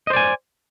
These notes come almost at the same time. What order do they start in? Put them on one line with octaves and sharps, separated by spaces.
D#5 C5 D5 G#5